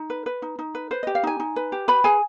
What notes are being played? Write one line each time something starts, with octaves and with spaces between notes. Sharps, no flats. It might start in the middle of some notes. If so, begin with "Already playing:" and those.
Already playing: D#4
B4
B4
D#4
D#4
B4
B4 C5
G4 D#5
F5
D#4 G#5
D#4
B4
G4
B4 B5
G#4 G#5